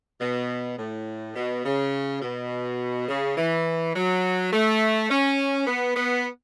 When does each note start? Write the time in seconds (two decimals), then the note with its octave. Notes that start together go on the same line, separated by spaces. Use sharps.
0.21 B2
0.78 A2
1.36 B2
1.64 C#3
2.22 B2
3.08 C#3
3.37 E3
3.95 F#3
4.52 A3
5.10 C#4
5.67 B3
5.96 B3